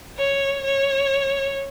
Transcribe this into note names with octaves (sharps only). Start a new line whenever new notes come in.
C#5
C#5